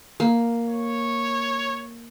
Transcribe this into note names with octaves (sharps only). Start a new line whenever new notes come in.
A#3
C#5